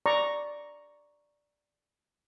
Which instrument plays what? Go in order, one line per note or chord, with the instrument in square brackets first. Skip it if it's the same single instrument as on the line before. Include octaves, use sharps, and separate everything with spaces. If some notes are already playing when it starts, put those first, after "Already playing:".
[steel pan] D5 A#5 C#6